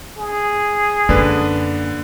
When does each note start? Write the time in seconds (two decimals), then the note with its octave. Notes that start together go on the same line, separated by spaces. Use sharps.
0.18 G#4
1.09 F#2 D3 A#3 D4 B4